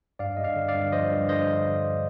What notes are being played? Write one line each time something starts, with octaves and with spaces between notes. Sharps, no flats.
G2 D5 F5
G2 D#5
D5 F5
D3
D5 F5
G2
F3 C5 D#5
G2
D3 C5 D#5